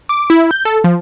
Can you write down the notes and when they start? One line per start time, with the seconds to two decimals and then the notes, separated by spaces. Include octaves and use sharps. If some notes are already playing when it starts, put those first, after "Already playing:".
0.09 D6
0.30 E4
0.51 G6
0.65 A4
0.84 F3